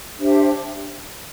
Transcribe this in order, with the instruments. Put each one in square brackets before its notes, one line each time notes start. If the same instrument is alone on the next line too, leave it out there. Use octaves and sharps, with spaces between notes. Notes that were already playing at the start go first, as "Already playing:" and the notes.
[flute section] D4 G4 C5 E5